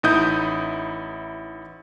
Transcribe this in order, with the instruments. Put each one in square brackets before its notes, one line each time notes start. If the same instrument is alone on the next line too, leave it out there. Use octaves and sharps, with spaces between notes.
[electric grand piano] A1 D#4 E4 D#6 G6